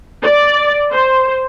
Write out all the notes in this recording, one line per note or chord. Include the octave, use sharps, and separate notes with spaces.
D5
C5